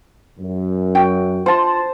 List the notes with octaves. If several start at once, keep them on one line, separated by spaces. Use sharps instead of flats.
F#2
F#4 G5
F4 C5 A5